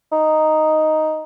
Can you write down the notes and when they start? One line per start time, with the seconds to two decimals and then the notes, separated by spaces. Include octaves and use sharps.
0.12 D#4